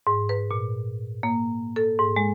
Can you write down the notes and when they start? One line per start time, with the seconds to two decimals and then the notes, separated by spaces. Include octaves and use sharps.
0.07 G#2
0.29 B4
0.51 A#2
1.23 A#3
1.76 A4
1.99 G#2
2.16 G#3